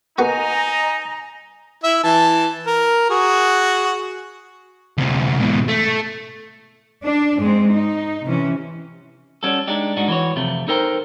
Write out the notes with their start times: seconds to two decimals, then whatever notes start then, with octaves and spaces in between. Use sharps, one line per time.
0.18 A#3 B3 D#4 F#4 D#5 G#5 A#5
1.83 E4 E5
2.03 E3 A5
2.66 A#4
3.10 F#4 G#4
4.98 D2 C3
5.40 G#2 B2
5.68 A3
7.04 D4
7.37 G#2 G#3 C4
7.71 D#4
8.24 C3 E3 C#4
9.43 G3 C#4 F#4 A4
9.68 G#3 D4 D#4 G4
9.97 G#2 D4 D#4 F#4
10.08 E3 F#4 C#5
10.36 F2 C3 A3
10.68 D#4 A4 A#4 C5 G5